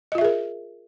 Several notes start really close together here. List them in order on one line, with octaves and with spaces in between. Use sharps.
D#5 F4 E5 G#4 A#4